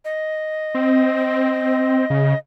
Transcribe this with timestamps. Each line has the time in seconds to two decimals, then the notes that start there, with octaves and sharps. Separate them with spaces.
0.05 D#5
0.75 C4
2.10 C#3